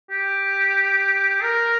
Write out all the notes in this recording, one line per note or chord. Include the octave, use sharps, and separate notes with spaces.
G4
A#4